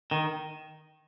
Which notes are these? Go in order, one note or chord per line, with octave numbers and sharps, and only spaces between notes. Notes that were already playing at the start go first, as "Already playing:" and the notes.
D#3